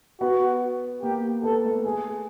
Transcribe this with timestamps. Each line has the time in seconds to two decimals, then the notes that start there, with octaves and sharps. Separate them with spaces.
0.20 B3 F#4
1.02 A#3 G4
1.44 B3 A4
1.64 A3
1.84 A3 G#4